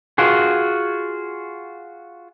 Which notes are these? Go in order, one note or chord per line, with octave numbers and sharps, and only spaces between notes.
F4 F#4 G#4